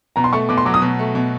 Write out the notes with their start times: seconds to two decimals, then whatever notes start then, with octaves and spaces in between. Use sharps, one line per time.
0.16 B2 A#5
0.24 C6
0.33 A3 C#6
0.49 B2 D6
0.57 C6
0.65 F#3 D6
0.74 D#6
0.82 B2
0.99 A3
1.15 B2